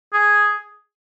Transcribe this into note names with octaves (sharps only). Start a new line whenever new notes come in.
G#4